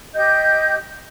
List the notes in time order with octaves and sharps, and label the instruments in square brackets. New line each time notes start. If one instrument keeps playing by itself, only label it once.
[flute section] G4 D#5 G5 G6